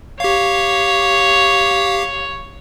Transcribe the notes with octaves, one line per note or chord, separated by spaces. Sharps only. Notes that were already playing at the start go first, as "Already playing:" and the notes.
G4 C#5 F5